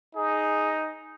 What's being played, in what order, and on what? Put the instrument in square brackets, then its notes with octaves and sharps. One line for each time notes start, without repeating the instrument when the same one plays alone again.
[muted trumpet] D#4 [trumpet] G#4